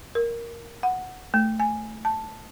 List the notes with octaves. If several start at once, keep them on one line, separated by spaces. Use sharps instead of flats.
A#4
F#5
A3
G#5
A5